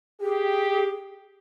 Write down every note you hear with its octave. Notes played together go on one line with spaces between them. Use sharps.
G4 G#4